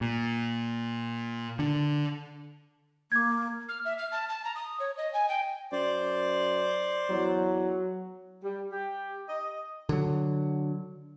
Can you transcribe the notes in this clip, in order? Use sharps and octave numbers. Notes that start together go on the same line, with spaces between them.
A#2
D3
A#3 D6 G#6
F6
E5
F6
A5
A5
A#5
D#6
C#5
D#5
G#5
G5
F#2 C5 D5
E2 F#3
G3
G4
D#5
D3 F#3